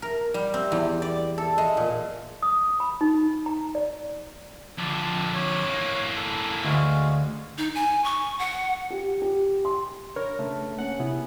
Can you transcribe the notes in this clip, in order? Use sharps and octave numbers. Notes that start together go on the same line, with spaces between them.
A#4
G3
C4
E2
D5
A4
G#3
A#2
D#6
B5
D#4
A#5
D5
F2 D3 A5
C#5
E3 A#3
A4
D2 G#3 F#4 F5
D#4
G#5
C#6
F#5
G4
G4
C6
D4 A#4 B4 C#5
C#3 A3
A#3 C#4 F#5
C3 B3 E4